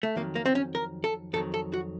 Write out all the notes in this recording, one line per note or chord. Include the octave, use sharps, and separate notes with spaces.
A3
F2 D#3 F#3 A#3
A#3
C4
C#4
A#4
A4
F2 D#3 F#3 A4
A4
F#4